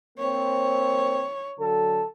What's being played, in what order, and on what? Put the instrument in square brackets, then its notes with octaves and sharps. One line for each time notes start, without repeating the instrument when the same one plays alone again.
[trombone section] A#3 C4 [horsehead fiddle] C#5
[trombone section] D3 F#3 A4